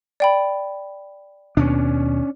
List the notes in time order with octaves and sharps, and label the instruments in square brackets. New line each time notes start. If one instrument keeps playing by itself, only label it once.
[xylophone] D5 G5 B5
[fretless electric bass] D#2 B2 D#3 [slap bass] C#4 D4